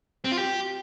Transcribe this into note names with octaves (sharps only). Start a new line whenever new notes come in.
C4
F4
G4